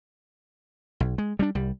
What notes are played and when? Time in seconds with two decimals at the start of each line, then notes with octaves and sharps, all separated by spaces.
1.00 B1
1.18 G#3
1.39 G3 A#3 D4
1.55 C2 G3